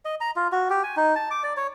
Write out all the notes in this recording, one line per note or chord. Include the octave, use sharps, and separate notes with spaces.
D#5
A#5
F4
F#4
G4
G#5
D#4
A5
D6
D5
C#5